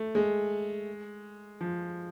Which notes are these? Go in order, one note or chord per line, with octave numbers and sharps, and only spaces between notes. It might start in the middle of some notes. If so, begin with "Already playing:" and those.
Already playing: A3
G#3
F3